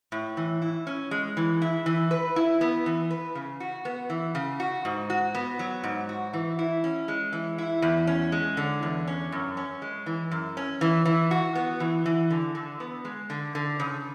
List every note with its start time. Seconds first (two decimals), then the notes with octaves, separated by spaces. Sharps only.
0.12 A2
0.37 E3
0.62 E4
0.87 C#4
1.11 G#3
1.37 E3
1.62 E4
1.86 E3
2.11 B4
2.36 E4
2.61 B3
2.86 E3
3.11 B4
3.35 C#3
3.60 F#4
3.85 B3
4.10 E3
4.35 C#3
4.60 F#4
4.85 G#2
5.10 F#4
5.35 B3
5.59 F#3
5.84 G#2
6.09 F#4
6.33 E3
6.59 E4
6.84 C#4
7.08 G#3
7.33 E3
7.58 E4
7.82 E2
8.07 C#4
8.32 G#3
8.57 D3
8.83 E2
9.07 C#4
9.32 F#2
9.57 C#4
9.82 G#3
10.06 E3
10.31 F#2
10.57 C#4
10.81 E3
11.05 E3
11.31 F#4
11.55 B3
11.80 E3
12.06 E3
12.30 D3
12.55 D3
12.80 B3
13.05 G#3
13.30 D3
13.55 D3
13.80 C#3